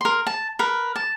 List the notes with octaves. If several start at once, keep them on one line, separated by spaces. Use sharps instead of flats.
A#4 C6
A5
A#4 B4
A5